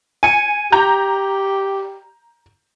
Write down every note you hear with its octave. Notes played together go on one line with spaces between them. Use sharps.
G#5 C#7
G4 A#5 G6